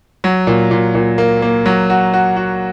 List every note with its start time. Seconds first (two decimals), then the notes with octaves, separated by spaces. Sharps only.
0.24 F#3
0.47 A#2
0.71 A#2
0.95 A#2
1.18 A#3
1.42 A#3
1.66 F#3
1.90 F#4
2.13 F#4
2.36 F#4